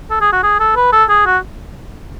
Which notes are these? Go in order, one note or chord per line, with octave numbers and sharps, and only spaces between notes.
A4
G#4
F#4
G#4
A4
B4
A4
G#4
F#4